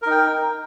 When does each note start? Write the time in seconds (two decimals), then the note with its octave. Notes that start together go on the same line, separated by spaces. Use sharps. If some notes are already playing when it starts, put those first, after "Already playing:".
0.02 A#4
0.07 D#4
0.11 G5